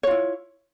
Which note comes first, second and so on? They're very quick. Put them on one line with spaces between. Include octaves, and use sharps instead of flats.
C#5 F4 E4